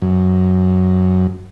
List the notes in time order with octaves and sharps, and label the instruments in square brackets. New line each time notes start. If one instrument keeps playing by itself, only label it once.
[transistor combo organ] F#2